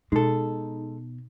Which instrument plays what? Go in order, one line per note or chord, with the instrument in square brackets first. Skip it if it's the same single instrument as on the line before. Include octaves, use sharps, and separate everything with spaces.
[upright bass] B2 [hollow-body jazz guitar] G#3 A4 [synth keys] D#4